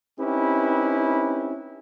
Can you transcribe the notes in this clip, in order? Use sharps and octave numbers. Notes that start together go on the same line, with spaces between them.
C4 C#4 D#4 E4 G4 B4